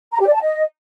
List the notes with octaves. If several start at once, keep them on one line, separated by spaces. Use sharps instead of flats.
A#5
G4
D5
A5
D#5